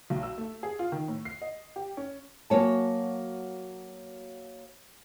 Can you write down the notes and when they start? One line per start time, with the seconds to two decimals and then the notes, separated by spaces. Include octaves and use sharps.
0.10 B1
0.23 E6
0.38 A3
0.63 G#4
0.79 F4
0.92 D#3
1.08 A2
1.25 C7
1.42 D#5
1.76 G4
1.97 C#4
2.50 F#3 A#3 F#4 C#5 G#5 A5